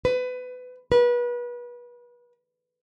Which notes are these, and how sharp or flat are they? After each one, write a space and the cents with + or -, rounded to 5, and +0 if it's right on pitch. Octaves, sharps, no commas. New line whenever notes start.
B4 +25
B4 -30